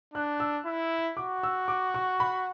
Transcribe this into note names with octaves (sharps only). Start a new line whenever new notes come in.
D4 F#6
E6
E4
F#4 D6
E6
D6
C#6
B5